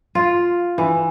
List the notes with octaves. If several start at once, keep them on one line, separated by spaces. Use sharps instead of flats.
F4
E3